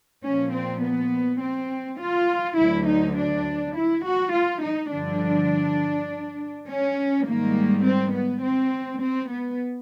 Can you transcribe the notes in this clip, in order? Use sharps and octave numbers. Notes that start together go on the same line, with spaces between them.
A#2 F3 C#4
C4
B3
C4
F4
D2 D3 F#3 E4
D#4
D4
E4
F#4
F4
D#4
G2 D3 F3 D4
C#4
G#2 D#3 G3 A#3
C4
B3
C4
C4
B3